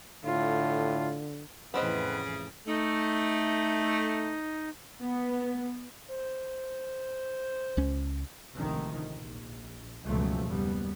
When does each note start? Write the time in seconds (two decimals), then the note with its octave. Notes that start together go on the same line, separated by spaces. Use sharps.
0.25 A2 D3 F4
1.74 F2 A2 C#3 E3 B3 C4 B4 D#5
2.67 A3 D#4
5.00 B3
6.11 C5
7.77 C#2 C#4
8.55 A1 D2 G#2 C3 D#3 F3
9.18 A#1
10.03 C#2 G2 B2 F3 F#3 A3
10.47 F#1 D#2 G3 B3